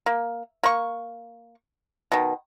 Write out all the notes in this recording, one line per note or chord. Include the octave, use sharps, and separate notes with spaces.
A#3
A#3 C#6
B2 D#3